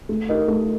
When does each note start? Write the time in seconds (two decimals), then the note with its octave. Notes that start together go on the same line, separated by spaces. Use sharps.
0.09 A3
0.29 D#4 A#4 D#5
0.48 A3